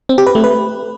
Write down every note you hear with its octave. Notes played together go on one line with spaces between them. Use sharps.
C4
G4
B4
A3
B4